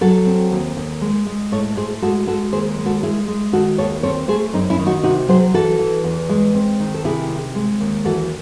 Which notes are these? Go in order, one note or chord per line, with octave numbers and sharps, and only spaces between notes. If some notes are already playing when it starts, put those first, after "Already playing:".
F#3 F#4 A4
C4
D#2
D#2
G#3
G#3
A2 A4 C#5
A2 G#4 C5
G#3 F#4 A4
G#3 F#4 A4
D#2 G#4 C5
G#3
F#4 A4
G#3 E4 G#4
G#3
D#3 F#4 A4
D#2 A4 C#5
C4 A4 C#5
A3 G#4 C5
F#2 C4 D#4
C#4 E4
D#3
D#4 F#4
C3 D#4 F#4
F#3 G#4 C5
E3 F#4 A4
E3
E2
G#3
C4
D#3
A4
C3 E4 G#4
C4
G#3
D#2
E3 F#4 A4